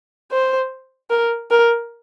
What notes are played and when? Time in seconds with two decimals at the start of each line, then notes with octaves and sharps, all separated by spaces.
0.32 C5
1.10 A#4
1.51 A#4